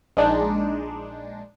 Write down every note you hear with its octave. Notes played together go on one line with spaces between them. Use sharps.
A#1 G#3 D4 D#4